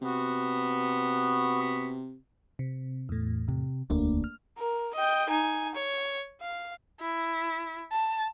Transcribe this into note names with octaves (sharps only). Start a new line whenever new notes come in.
C3 B3 F#4
C3
E2 A2
C3
E1 D2 A3 A#3 D4
F6
A#4
D#5 G5
D#4 G#5
C#5
F5
E4
A5